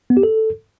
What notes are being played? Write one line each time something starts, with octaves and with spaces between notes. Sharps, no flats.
B3
G4
A4